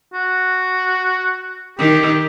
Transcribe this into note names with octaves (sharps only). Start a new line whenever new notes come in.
F#4
D#3 G4